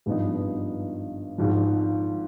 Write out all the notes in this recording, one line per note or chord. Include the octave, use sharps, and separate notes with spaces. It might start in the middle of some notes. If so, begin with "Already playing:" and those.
G#1 G2 F3 B3 D#4
G#1 G#2 F3